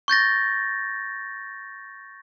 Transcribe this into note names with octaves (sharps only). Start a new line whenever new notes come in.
C#6 G6 A6 A#6